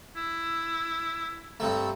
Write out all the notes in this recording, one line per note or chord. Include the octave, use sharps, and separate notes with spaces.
E4
G2 C3 A3